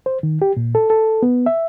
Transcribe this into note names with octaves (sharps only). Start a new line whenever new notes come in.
C5
D#3
G4
A#2
A4
A4
B3
E5